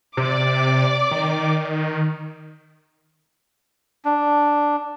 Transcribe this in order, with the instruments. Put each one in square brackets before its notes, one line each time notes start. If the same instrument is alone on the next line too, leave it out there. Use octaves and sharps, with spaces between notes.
[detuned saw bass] C3 [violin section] D5 D6
[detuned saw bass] D#3
[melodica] D4